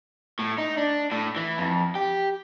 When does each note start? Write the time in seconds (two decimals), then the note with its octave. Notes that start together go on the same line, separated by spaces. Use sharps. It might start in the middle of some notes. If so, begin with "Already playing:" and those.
0.39 A2
0.58 D#4
0.77 D4
1.12 A2
1.36 E3
1.58 F2
1.95 G4